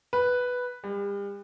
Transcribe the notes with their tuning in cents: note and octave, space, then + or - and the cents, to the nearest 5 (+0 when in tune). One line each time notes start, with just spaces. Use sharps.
B4 +0
G3 +40